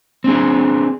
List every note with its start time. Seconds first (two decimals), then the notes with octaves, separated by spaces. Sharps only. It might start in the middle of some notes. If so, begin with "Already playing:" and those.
0.24 C4 D4 G#4